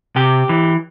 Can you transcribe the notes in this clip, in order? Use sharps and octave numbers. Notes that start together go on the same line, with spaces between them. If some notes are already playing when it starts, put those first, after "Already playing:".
C3 G4
E3